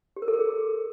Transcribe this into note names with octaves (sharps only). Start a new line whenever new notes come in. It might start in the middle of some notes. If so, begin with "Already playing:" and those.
G4
A#4
A4
A#4
G#4